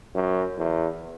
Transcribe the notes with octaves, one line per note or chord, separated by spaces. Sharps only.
F#2
E2